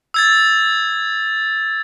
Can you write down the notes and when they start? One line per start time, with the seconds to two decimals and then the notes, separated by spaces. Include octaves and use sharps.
0.14 E6 G#6 A6